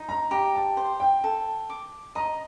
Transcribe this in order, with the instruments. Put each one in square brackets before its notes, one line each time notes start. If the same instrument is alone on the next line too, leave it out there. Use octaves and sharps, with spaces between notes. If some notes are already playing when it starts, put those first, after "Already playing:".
Already playing: [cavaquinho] D#4
[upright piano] A#5
[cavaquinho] G4 [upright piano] A#5
[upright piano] A5
[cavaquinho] C5
[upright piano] G5
[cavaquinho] A4
D6
[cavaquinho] D#5 [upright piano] A#5